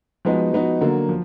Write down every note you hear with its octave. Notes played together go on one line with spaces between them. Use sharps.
F3 G#3 B3 D#4 F#4
F3 B3 D#4 F#4
D3 F#3 A#3
F3